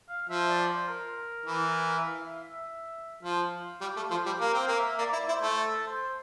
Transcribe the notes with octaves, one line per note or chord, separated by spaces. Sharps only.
F5
F3 E5
D5
C5
A#4
E3
E5
F5
E5
E5
F3 F5
G3
A3
F3
G3
A#3 F5
C4
F5
A#3
E5
A#3 D5
E4
E4 C5
A3
A4
C5